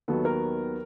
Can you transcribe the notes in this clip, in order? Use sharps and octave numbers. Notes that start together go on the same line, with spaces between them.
D#2 D#3 F#3 B3 A4
A#4